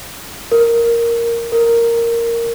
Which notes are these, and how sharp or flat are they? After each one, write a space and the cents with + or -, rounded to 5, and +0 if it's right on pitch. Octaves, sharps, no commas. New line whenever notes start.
A#4 +0
A#4 -5